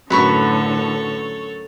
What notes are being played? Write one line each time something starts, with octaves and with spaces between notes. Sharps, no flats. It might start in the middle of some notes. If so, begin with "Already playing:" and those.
F#2 A2 D3 A4 B4 C#5 B5 C#6